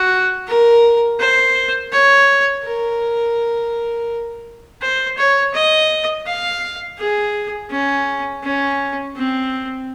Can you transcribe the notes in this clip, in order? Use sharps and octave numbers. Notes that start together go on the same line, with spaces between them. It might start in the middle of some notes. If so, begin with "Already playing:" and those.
Already playing: F#4
A#4
C5
C#5
A#4
C5
C#5
D#5
F5
G#4
C#4
C#4
C4